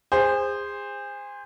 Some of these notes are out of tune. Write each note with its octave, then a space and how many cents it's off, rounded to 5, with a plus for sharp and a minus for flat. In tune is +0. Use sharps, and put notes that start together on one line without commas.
G#4 -30 C5 +0